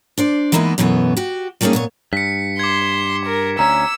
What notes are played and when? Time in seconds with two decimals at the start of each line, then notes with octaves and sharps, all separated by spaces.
0.18 D4 C5 D5
0.52 E3 G#3 A#3 B3 D#4 E4
0.78 F#2 B2 E3 A3 B3
1.17 F#4 G4
1.61 G3 A3 A#3 C#4 D#4 G#4
1.73 A#2 B3 C#5
2.13 G2 B6 C#7
2.59 C6 D6 G#6
3.26 A#4
3.59 D2 C#4 A#5 E6